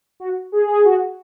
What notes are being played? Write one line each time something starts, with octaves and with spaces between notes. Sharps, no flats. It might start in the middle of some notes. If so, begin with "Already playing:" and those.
F#4
G#4
G#4
F#4